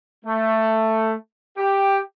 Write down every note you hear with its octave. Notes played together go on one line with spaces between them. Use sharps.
A3
G4